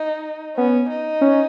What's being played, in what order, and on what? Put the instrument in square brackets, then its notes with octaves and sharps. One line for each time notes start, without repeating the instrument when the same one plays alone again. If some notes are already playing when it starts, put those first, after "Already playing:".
Already playing: [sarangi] D#4
[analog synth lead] B3 [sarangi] C#4
[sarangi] D#4
[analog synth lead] C#4